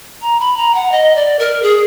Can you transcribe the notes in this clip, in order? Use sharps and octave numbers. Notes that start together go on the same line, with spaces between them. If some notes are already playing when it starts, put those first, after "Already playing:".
A#5
B5
A#5
F#5
D#5
D5
A#4
G#4